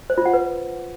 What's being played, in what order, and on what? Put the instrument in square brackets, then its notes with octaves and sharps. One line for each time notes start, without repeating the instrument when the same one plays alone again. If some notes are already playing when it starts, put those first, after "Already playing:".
[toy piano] C5
F4
F#5
B4